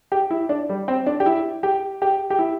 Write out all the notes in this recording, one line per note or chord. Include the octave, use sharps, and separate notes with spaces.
G4
E4
D4
G3
C4
D4
G4
E4
G4
G4
G4
E4